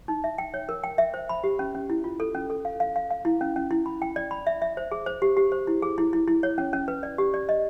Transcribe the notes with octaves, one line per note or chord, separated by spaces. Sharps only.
D#4
E5
G5
C#5
A#4
G5
E5
C5
B5
G4
C#4
C#4
E4
F4
A4
C#4
A4
F5
F5
F5
F5
E4
C#4
C#4
E4
B5
G5
D5
B5
E5
E5
C5
G#4
C5
G4
G4
C5
E4
G#4
E4
E4
E4
C#5
C#4
C#4
B4
D5
G4
D5
D#5